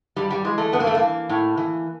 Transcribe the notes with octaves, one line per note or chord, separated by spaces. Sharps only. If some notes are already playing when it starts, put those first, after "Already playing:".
G2 G3
G3
E3 G#3
A3
G2 B3
A#3
A3
A#3
E3
A2
E3